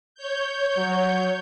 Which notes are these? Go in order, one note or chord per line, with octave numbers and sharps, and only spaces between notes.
C#5 G6
F#3